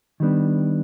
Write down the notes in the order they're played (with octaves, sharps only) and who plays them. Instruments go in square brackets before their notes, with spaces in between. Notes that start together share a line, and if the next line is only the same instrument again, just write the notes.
[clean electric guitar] D#3 G3 B3 D4